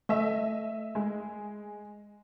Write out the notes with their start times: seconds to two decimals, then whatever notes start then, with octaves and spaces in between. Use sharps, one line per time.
0.09 A3 D#5 E5
0.95 G#3